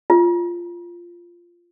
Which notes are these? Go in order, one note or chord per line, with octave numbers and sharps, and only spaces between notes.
F4